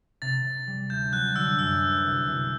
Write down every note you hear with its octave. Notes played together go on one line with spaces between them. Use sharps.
C3 A6
C3
G3
D2 G6
F#3 F#6
D3 E6
F#2 E6
B3
C2
C2